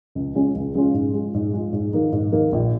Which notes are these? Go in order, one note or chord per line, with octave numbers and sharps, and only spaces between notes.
C#2
C#3 G#3 C#4 F4
C#2
C#3 G#3 C#4 F4
G#2
G#3 F4
G#2
G#3 F4
G#2
D#3 A#3 D#4
G#2
D#3 A#3 D#4
A#1